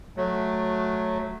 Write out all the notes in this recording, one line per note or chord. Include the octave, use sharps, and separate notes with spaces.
F#3 A3